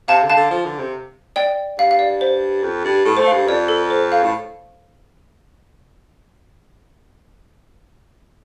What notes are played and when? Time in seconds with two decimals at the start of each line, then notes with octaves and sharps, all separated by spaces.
0.08 C3 F5 A5
0.22 D3
0.30 F5 A5
0.37 D3
0.51 F3
0.65 D3
0.79 C3
1.36 D5 G5
1.78 G2 F5
1.91 F5
1.99 D5
2.21 C5
2.63 F2
2.85 G2
3.05 A2 A4
3.17 C5
3.20 A3
3.26 F5
3.33 G2
3.47 F2 D5
3.68 A4
3.90 C5
4.12 F5
4.23 A2